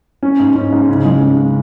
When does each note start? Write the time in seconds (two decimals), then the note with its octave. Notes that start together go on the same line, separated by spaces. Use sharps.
0.23 C#4
0.40 G#2
0.56 C#4
0.72 G#2
0.88 C#3
1.05 G#3
1.21 C#3
1.38 C#3